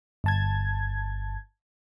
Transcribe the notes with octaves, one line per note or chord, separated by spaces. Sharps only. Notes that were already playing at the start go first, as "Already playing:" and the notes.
G1 A5 G#6